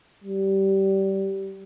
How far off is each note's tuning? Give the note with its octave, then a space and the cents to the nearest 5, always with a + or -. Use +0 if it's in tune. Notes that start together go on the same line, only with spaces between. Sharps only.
G3 -20